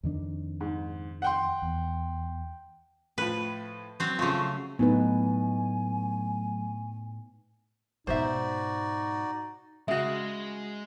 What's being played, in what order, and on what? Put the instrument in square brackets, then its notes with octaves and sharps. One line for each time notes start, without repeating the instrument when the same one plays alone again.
[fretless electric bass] F2 D#3 D4
[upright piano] G#2
F#5 G5 C6
[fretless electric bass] E2
[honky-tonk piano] A2 F3 [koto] B4
[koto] F#3 C4
[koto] C#3 A3 [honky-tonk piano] F3 C6 C#6
[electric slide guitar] A2 [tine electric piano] F#3 A3 [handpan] B3 D#4 B4 [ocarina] G#5
[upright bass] G#2 B2 [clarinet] D#4 [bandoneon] F#4 D5 [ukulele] C5 E5
[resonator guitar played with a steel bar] C#3 F#4 [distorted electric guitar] G#3 [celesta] E5